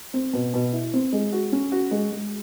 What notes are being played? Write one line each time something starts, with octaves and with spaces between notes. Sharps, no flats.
C4
B2
B2
E4
C4
G#3
F#4
C#4
F#4
G#3
G#3